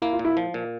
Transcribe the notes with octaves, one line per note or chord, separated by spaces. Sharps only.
A#3 E4
F4
A#2
E4
F3
A#2